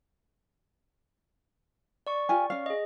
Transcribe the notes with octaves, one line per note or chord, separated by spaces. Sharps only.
D5 C#6
F4 G4 G#5
C#4 F5
G#4 D#5